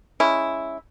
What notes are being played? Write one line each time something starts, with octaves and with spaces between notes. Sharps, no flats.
G#3 C#4 E4